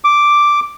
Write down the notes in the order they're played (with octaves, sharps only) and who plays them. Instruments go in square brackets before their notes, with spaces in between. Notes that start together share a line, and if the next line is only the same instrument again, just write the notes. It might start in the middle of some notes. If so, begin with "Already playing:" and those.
[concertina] D6